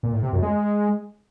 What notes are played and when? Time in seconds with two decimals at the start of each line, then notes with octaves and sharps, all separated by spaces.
0.03 A#2
0.13 A2
0.23 C3
0.33 F#2
0.43 G#3